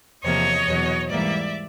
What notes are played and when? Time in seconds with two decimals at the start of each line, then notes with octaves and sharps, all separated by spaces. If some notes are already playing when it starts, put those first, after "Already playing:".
0.22 E2 C3 F3 A#3 C#5 D#5
0.66 E2 B2 F#3
1.09 G#2 E3 G3 A#3 D5 E5